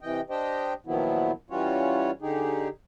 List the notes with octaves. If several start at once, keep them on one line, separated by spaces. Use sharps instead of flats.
C3 E3 D#5 G5
D4 G4 C5 D#5 G5
A#2 D#3 F3 F#3 B3 E4
E3 G3 C#4 F4 F#4 C#5
D3 D#4 G4 G#4